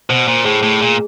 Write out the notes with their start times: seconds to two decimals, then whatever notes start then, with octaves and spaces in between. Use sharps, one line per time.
0.10 B2 C5
0.28 A#2 C5
0.45 A2 G#4
0.63 A2 A3
0.81 A#2 G#4